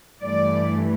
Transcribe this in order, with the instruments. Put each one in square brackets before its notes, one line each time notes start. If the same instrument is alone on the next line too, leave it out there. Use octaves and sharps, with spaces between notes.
[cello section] G2 E3 A3 D5